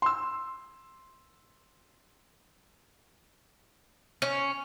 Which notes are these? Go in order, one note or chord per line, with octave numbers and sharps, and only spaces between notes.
C6 E6
C#4